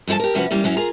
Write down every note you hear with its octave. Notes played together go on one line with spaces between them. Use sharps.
G2 F3 E4 A4 A5
G4 A#4
C3 F3 C#4 F#4 B4
E3 G3 A#3 C#4
F#2 F#3 C#4
F4 G#4 A#4 A#5